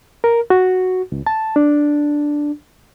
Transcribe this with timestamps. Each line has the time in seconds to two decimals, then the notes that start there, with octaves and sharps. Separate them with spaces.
0.24 A#4
0.50 F#4
1.12 C#2
1.27 A5
1.56 D4